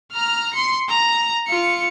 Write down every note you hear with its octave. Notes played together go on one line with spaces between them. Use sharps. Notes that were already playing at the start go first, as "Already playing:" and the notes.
A#5 F6
C6 C#7
A#5
F4 C#7